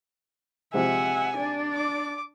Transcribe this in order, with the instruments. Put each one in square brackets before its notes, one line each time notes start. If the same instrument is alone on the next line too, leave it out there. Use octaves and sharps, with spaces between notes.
[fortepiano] C3 F3 G#3 [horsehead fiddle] E5 F#5 [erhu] G#5
[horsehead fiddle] D4 D5
[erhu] D6